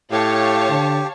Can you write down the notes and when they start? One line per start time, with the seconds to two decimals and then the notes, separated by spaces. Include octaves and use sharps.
0.12 A2 G4 C#5 F5 A5
0.70 D3